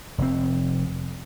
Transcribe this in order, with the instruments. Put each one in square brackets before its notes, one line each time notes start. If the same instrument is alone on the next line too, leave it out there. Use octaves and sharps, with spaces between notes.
[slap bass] F1 C4